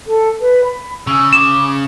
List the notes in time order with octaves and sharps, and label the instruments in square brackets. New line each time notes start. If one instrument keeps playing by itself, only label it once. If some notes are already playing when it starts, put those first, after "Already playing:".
[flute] A4
B4
B5
[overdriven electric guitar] C#3 [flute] E6
[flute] D6 [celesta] E7